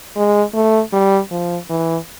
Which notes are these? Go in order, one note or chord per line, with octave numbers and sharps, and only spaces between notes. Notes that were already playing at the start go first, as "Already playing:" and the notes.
G#3
A3
G3
F3
E3